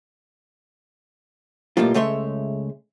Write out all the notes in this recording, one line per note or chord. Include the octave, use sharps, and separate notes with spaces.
B1 A2 G3 A3 A#3 F4
C#2 G#3 A3 C#5 E5 C6